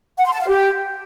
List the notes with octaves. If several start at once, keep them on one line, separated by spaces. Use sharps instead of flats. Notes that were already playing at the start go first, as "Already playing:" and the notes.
F#5
C6
A5
F5
G4